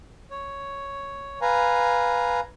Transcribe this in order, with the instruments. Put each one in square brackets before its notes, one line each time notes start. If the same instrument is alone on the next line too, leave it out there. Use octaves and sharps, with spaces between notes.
[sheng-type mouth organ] C#5
B4 F5 G#5 A#5